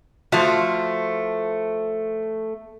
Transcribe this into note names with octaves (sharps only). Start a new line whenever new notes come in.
F3 A3 F4 F#4